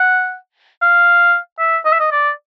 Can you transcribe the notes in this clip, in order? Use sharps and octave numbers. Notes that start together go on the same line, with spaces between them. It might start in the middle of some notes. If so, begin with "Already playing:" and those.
Already playing: F#5
F5
E5
D#5
E5
D#5
D5